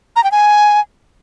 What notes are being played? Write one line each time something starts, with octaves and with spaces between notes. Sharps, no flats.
A#5
G5
G#5